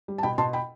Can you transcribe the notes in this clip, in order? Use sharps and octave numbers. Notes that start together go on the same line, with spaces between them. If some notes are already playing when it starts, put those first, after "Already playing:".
G3
A5
B2 G5 B5
B2 A5 C6
G5 B5